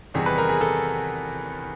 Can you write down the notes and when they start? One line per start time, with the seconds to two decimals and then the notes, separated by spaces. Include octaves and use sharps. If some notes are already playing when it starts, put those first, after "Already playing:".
0.14 E2 C3 D#3 G3 G#4
0.26 B4
0.38 A#4
0.49 G#4
0.61 A4